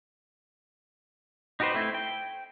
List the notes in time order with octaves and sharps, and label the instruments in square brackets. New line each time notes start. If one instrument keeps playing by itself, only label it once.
[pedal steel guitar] D#4 F#4 G4 B4 C5
A3 C4 E4
G5